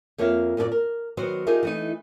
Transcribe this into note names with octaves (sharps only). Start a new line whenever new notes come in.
F2 A#3 C#5 E5 F5
F#2 A#2 F#3 A4 D5
A#4
D#3 F#3 B3 C5
D#4 F4 G4 G#4 A#4 E5
E3 A3 D#4